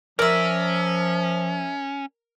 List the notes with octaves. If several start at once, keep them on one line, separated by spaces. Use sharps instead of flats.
F3 C#4 A#4 D5 E5